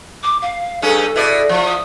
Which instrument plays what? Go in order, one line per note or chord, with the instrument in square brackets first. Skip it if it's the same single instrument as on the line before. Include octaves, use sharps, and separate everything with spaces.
[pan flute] D6
F5
[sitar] G2 C#4 G#4 [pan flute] A4
[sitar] B2 E4 D5
F3
[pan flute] D#6